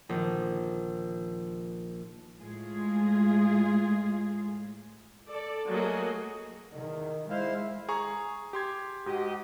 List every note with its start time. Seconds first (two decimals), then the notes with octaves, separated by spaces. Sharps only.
0.09 A#1 D#3
2.39 A2 G#3 F4 G#4
5.29 A4 D5
5.69 F#3 A3 A#3 F#4 G#4 D#5
6.72 E2 D#3
7.30 G#3 E4 C5 F5
7.89 G#4 A#5 C#6
8.53 G4 C6 G#6
9.06 G#2 F#4 G4 D#5